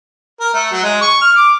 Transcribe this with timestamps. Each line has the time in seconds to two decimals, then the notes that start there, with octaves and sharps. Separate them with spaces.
0.40 A#4
0.54 A3
0.72 F#3
0.83 G#3
1.01 C#6
1.21 F6
1.36 D6